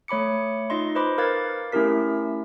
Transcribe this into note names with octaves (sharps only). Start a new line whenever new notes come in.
A3 C#5 B5 D6 C#7
D#4 F4 D#5 C6
B4 C5 D#5 B5 D6
A#4 B4 F5 D6 G#6 A6
A3 C#4 E4 G4 A#4 B6